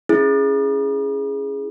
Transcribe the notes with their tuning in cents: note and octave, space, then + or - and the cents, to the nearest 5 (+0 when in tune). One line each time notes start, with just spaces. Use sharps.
C#4 +0 E4 +0 G#4 +0